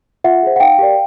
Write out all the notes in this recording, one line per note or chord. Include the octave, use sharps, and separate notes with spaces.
F4 E5 F#5
G#4 C5
F#5
D#4 F5 G5
G4 A#4 D5